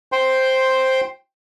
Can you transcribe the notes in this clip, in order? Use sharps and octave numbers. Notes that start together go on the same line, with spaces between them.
C5 G5 C6